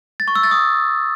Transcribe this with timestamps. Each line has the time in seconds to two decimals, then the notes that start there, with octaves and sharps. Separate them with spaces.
0.20 A6
0.28 C#6
0.35 E6
0.43 A6
0.51 D#6